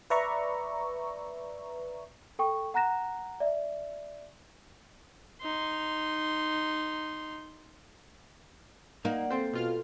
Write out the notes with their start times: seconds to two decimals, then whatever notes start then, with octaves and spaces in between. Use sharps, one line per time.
0.10 B4 D5 E5 A#5 C#6
2.39 A4 G5 C#6
2.74 F#5 A#5 F#6 A#6 E7
3.40 D5 E5
5.42 D#4 C6
9.05 A#3 D#4 D5 F#5
9.31 C4 A4 C5
9.53 B2 F4 F6